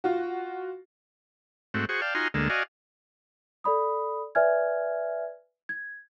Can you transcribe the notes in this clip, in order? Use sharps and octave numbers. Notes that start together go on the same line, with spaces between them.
F4 F#4
G#2 A3 C4 F#4
F#4 G#4 C5 C#6
D5 F5 G5 A5
D#4 F4 F#4 G#5 A#5 C6
D2 D3 G#3 A#3 A5
F#4 D5 D#5 F5 G#5
A4 D5 B5 D#6
B4 D5 E5 G#5 F6 G#6
G#6